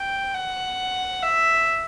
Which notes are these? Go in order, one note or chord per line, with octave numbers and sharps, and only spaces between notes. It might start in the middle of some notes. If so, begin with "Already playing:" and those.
Already playing: G5
F#5
E5